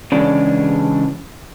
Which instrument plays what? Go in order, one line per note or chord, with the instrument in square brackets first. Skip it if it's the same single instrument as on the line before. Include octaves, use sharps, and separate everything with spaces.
[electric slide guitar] C#3 E3 G#3 C#4 D4